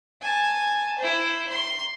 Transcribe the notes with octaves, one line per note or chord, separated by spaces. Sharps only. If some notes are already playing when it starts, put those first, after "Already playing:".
G#5 A5
E4 C5
C6